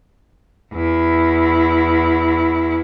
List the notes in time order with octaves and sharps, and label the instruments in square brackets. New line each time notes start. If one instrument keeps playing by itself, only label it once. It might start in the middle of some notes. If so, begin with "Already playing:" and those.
[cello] E2 E4